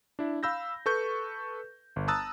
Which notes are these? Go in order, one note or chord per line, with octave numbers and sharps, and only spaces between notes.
D4 E4
F5 B5 E6 G6 A#6
A4 B4 C#6 G6
G1
A5 A#5 D#6 E6 F#6 A6